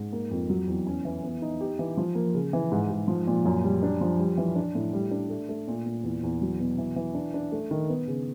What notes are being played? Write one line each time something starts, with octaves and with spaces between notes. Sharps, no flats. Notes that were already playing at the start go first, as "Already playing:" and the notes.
Already playing: G#2
A#3
F2
F#3
E2
C#4
E3
B3
D#4
G4
E3
F3
A#3
C#3
E3
G#2
G#2
F3
A#2
F#2
G3
D4
F3
G3
E3
D4
A2
G3
D4
A3
A3
A#2
A#2
E2
E2
F#3
B2
E3
E3
D4
D4
A3
D#3
B3
C#3